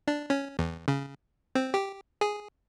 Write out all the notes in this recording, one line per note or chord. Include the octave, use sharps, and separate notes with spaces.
D4
C#4
E2
C#3
C4
G4
G#4